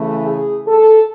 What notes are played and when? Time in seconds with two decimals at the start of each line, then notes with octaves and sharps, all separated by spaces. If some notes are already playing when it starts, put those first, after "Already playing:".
Already playing: C#3 E3 A3
0.26 G#4
0.66 A4